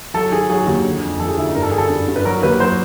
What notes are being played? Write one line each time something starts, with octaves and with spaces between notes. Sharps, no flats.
F#3 A4
D#3 G#4
F#3 G#4
D#2
D3
F2
F3 A4
G#4
D3 E4
D#4
G2 A#4
A4
D3 G#4
A4
G2
G2
B4
F#3 A#4
D#2 B4
F#3 C5